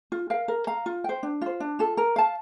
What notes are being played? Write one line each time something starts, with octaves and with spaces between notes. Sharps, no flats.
F4
A#4 F5
A#4
F5 A#5
F4
C5 G5
D4
F4 C5
D4
F4 A4
A#4
F5 A5